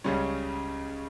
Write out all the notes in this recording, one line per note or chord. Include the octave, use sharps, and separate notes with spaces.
C#2 C#3 G3 C#4